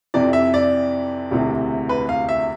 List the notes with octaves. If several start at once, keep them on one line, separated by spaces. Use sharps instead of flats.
F2 C3 E3 D5
E5
D5
E1 D2 C3 E3
B4
F5
E5